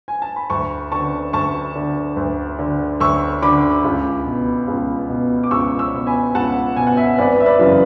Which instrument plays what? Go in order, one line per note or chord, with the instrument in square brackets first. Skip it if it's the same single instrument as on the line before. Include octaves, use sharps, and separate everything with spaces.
[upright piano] G#5
A5
B5
D2 A5 C#6
D3 A5 C#6
D2 A5 C#6
D3
D2
D3
D2 C#6 E6
D3 B5 D6
C#2
B2
C#2
B2
D6
C#2 C#6 E6
C#6 E6
B2
G#5 B5
C#2 F#5 A5
B2 G#5
F#5
E5 G#5
G#1 B4 D5
E5
B4 D5
F#2 C#3 E3